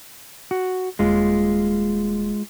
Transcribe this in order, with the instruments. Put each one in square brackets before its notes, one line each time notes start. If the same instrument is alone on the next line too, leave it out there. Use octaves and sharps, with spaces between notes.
[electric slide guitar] F#4
[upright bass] D#1 [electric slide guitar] G#3 F4